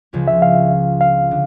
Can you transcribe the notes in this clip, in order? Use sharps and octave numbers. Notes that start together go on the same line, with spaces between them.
C#2 C#3 F3 C#4
E5
F5
F5
D3